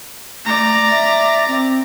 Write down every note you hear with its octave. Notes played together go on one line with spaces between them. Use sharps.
A3 D5 A#5
E5
C4